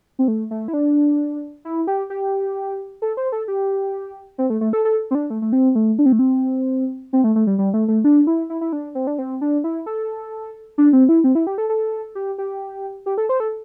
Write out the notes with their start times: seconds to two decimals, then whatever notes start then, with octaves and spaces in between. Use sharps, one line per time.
0.19 C4
0.28 A3
0.51 A3
0.68 E4
0.73 D4
1.65 E4
1.87 G4
2.10 G4
3.02 A4
3.17 C5
3.32 A4
3.48 G4
4.38 C4
4.50 A3
4.61 A3
4.73 A4
4.85 A4
5.11 C4
5.15 D4
5.30 A3
5.42 A3
5.53 C4
5.75 A3
5.99 D4
6.06 C4
6.12 A3
6.19 C4
7.13 C4
7.24 A3
7.36 A3
7.47 G3
7.59 G3
7.74 A3
7.88 A3
8.04 D4
8.27 E4
8.50 E4
8.61 E4
8.73 D4
8.95 C4
9.07 D4
9.18 C4
9.41 D4
9.64 E4
9.86 A4
10.78 D4
10.93 C4
11.09 E4
11.24 C4
11.35 E4
11.47 G4
11.58 A4
11.69 A4
12.15 G4
12.38 G4
13.06 G4
13.18 A4
13.29 C5
13.40 A4